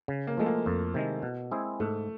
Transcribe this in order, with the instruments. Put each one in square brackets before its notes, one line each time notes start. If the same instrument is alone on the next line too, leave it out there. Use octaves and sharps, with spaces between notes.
[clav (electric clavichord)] C#3
[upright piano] A#3
[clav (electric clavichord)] F3 G#3 [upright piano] A3
[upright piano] A#3
[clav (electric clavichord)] F2
C3 D#3 G#3
B2
G#3 C4 E4 G#4
[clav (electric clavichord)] G#2 [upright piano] A3